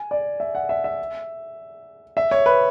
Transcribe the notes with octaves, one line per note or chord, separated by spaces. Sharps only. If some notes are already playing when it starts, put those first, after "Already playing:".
Already playing: G#5
D5
E5
F#5
E5
E5
E5
C#5
B4